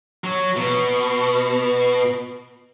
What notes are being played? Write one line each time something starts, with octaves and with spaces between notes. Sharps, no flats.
F#3
B2